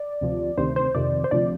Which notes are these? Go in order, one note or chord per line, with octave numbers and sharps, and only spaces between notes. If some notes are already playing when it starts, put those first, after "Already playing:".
Already playing: D5
D2 C3 F3
D2 C3 D#3 C5
C5
F2 C3 D#3 D5
C5
D2 C3 F3 D5